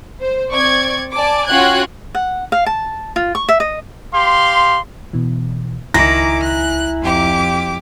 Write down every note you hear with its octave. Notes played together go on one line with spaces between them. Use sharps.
C5
C4 D5 C#6 G#6
D5 G#5 A5 D6
C#4 F4 F#4 G5 F#6 G#6
F#5
F5
A5
F4
C#6
E5
D#5
G4 F5 C6
B2 E3
C#2 D#3 E4 G#5 A#5 D6 A#6
F#6
F2 G4 D6